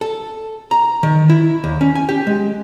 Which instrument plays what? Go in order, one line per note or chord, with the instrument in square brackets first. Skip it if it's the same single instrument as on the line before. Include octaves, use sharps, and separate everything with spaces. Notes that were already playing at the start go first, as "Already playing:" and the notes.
[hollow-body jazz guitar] A4
A#5
D#3
E4
D#2
C#4
G#5
G4
G#3